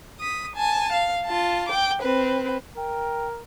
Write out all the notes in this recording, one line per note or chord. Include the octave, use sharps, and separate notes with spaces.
D#6 B6
G#5 A5
F5
F4 A5
G5 D6
C4 B4
A#4 G5